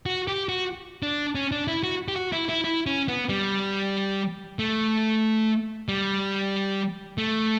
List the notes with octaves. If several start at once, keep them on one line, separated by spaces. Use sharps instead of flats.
F#4
G4
F#4
D4
C#4
D4
E4
F#4
G4
F#4
E4
E4
E4
C#4
B3
G3
A3
G3
A3